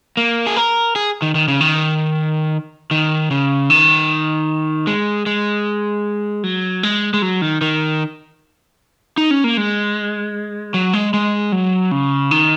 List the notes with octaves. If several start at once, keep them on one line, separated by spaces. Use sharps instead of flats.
A#3
G#4
A#4
G#4
D#3
D#3
C#3
D#3
D#3
C#3
D#3
G#3
G#3
F#3
G#3
G#3
F#3
D#3
D#3
D#4
C#4
A#3
G#3
F#3
G#3
G#3
F#3
C#3
D#3